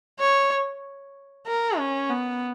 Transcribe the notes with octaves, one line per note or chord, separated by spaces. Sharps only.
C#5
A#4
C#4
B3